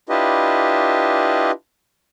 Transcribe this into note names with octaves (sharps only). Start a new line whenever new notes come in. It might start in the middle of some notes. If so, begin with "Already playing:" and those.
D4 E4 F4 G4 B4 D#5